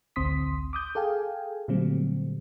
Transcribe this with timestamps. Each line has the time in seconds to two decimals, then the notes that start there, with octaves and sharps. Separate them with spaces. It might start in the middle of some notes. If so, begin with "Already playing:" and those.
0.16 A1 D2 C4 C6 D#6 B6
0.73 D6 D#6 G6
0.95 G#4 A4 F5 G5 G#5
1.68 A#2 D3 F#3 G3 A3 C4